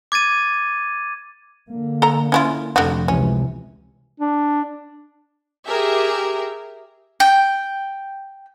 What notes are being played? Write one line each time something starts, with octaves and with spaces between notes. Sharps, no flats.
D6 G#6 A6 D#7
D3 A#3
A4 A#5
C#4 E4 F4
F1 D3 G3 F#4
C#2 C3 E3 C#4
D4
G4 G#4 A#4 E5
G5